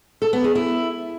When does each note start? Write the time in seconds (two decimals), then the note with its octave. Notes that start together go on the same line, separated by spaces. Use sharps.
0.22 A4
0.33 B3
0.44 G#4
0.55 E4